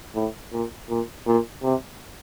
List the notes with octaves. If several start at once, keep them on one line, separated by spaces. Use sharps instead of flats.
A2
A#2
A#2
A#2
C3